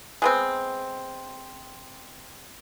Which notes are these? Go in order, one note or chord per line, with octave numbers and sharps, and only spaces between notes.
G#3 B3 C4